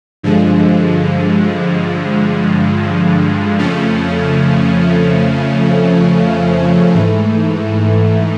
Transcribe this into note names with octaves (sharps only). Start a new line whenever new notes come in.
G2 D3 F3 G#3
F2 C#3 F3 A3 C#4
G#2 E3 A3